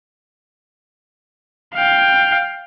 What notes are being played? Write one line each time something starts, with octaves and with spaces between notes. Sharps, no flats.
F5 G5